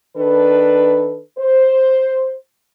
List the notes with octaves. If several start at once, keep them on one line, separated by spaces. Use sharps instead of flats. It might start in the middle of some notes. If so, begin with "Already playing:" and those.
D#3 D4 A4 B4
C5